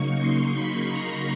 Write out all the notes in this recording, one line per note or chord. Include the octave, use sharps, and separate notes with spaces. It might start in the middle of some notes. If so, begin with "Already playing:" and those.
Already playing: C#3 F#3 A#3 D#4 C#6
C6
B5
A#5